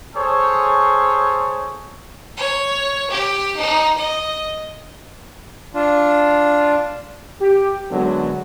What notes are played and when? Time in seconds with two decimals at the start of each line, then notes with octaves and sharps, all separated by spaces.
0.15 G#4 A4 C5 C#5
2.37 C#5
3.10 G4
3.56 D#4
3.97 D#5
5.74 D4 F4
7.41 G4
7.91 F#2 D3 F#3 G#3 B3